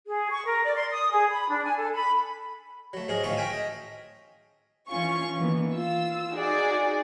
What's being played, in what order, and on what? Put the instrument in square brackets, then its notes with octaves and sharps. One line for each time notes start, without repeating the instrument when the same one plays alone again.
[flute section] G#4
C#6
A#4
D5
C6
D#6
G#4
B5
D4
G#5
A4
B5
[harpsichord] F#3 A3
G#2 F#3 G#4 A#4
A2 D#3 A3 C#4 F4 C#6
A#4 E5 G5 G#5
D#5
[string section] E3 C#4 F4 C#6
D#3 E3 A#3 B3
F4 E6
D#4 F#4 G#4 D5